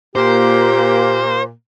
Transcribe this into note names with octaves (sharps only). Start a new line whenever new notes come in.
A#2 A#3 G4 C5